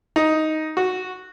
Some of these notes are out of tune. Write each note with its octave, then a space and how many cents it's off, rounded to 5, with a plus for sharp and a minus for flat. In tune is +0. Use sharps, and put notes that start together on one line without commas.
D#4 +5
F#4 -10